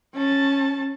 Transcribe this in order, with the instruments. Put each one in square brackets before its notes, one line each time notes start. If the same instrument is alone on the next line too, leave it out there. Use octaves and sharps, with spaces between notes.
[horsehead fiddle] C#4 A5